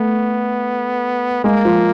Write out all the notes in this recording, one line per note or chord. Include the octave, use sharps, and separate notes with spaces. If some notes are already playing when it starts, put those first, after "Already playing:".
Already playing: A3 B3
G#3 A#3
F3